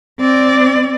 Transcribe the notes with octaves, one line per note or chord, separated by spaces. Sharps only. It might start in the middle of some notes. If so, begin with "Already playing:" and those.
C4 D5